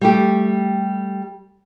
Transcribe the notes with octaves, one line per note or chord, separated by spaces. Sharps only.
G3 A3 G4